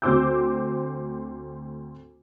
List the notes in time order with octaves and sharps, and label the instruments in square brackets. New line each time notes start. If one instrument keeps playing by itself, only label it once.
[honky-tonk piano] D2 C4 C5 D6 E6 G6